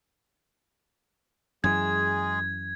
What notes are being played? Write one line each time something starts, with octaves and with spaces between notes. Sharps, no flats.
F#2 E3 G#3 G#4 G#6